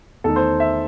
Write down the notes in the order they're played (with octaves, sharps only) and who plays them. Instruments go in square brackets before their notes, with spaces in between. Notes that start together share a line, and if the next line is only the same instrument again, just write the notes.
[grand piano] E2 D#3 A3 D#4 [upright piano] A4
[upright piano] C5
E5